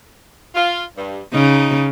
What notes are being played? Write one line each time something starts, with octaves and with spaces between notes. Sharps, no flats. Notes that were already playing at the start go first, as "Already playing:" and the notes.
F4
G2
C#3 D#4